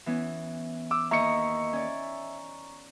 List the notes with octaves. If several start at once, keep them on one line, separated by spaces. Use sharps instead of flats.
E3 B3 C#4
D6 E6
D#2 D#5 E5 A#5 C#6 C#7
C#4 D5